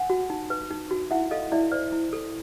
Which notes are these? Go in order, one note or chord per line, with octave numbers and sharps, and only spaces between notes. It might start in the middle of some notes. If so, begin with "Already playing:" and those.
Already playing: F#5 G#5
F#4
D#4
B4
D#4
F#4
E4 E5 F#5
A4 D#5 F5
E4 D5 E5
C5 D5
E4
A4